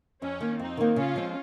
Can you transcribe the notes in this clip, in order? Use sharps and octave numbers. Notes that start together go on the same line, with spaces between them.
F2 C#4
D#3 A#3
F2 C4 D#4
D#3 A#3
C#3 C#4 F4
F3 G#3 C4